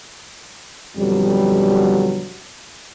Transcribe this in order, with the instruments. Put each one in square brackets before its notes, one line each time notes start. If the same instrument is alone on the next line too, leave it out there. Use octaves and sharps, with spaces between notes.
[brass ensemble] F2 B2 D3 F#3 G3